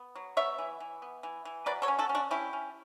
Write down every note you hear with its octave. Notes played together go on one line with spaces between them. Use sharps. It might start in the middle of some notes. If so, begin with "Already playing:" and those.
Already playing: B3
F#3
B3 C#5 E5
E3
E3
B3
E3
E3
F#3 B4 D5
A4 C#5
C#4
F#4 A4
C#4
D4 F#4
C#4 E4 G4
C#4